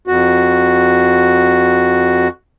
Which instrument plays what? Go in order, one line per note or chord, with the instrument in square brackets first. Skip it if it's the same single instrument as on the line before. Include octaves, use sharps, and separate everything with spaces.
[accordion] F2 F#4